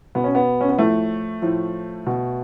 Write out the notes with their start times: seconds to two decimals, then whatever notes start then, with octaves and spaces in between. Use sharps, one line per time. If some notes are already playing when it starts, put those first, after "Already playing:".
0.15 B2 B3
0.24 C#4
0.35 B3
0.61 C#4
0.69 B3
0.78 A2 F3 A3
1.42 A2 F3
2.06 B2